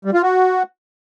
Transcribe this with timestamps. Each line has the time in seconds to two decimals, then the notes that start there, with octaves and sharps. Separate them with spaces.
0.05 G3
0.14 F4
0.23 F#4